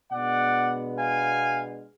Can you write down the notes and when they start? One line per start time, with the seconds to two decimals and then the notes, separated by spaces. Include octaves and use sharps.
0.11 B2 G#3 B3 D4 D5 F#5
0.98 F5 G#5